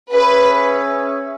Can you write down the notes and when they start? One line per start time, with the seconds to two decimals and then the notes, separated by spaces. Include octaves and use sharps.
0.13 C#4 G#4 B4 E5